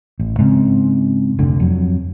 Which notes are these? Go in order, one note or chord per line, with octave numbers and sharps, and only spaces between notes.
A1
G#2 C#3 C4
F1 D2 D3
F2 F#3